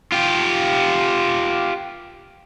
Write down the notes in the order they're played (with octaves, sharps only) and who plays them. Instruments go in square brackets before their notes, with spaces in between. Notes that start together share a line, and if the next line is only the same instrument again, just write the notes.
[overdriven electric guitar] F4 G4